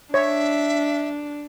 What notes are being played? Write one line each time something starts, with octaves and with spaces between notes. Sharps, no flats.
D4 C#5 E5